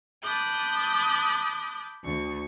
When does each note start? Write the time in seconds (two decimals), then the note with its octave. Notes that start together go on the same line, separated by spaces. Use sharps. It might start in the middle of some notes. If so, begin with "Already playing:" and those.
0.23 A5 B5 D6 D#6 F#6 G6
2.03 D2 C#6